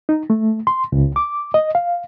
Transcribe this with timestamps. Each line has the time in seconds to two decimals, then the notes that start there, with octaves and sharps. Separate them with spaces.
0.09 D#4
0.30 A3
0.67 C6
0.92 C#2
1.16 D6
1.54 D#5
1.75 F5